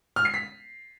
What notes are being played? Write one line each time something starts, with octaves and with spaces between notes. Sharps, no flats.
F6
C7
B6